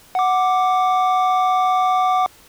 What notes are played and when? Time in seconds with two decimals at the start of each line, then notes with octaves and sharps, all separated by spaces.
0.15 F#5 D6